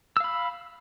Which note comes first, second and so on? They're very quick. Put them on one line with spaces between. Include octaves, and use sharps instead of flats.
E6 F5 B5